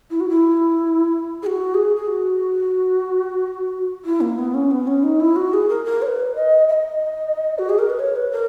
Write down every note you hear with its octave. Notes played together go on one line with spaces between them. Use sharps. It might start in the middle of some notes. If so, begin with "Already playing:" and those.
E4
F#4
E4
G#4
F#4
G#4
G#4
F#4
E4
A#3
B3
C#4
B3
C#4
D#4
E4
F#4
G#4
A#4
A#4
C#5
B4
D#5
E5
D#5
F#4
G#4
A#4
B4
C#5
B4
A#4